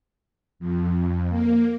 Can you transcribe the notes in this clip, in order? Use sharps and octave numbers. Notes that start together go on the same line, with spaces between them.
F2
A#3